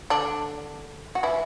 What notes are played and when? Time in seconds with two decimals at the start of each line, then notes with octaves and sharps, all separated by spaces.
0.10 D3 D4
1.15 F#4
1.23 E3 E4